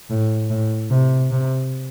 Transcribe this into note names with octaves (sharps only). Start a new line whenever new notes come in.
A2
A2
C3
C3